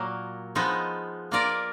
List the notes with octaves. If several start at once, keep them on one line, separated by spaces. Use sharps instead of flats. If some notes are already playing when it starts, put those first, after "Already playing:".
Already playing: A#2 F#3 A#3
F3 G#3 B3 D#4
A#3 F4 A#4 D5